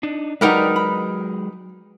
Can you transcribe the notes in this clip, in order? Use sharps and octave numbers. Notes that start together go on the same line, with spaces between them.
D4 D#4
F#3 G#3 D#4 G4 A#4 B4 D5 F#5
B5